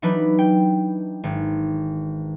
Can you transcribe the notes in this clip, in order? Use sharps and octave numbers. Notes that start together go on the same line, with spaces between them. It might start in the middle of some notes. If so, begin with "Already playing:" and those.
E3 F#3 D4 D#4 B4
G5
G#1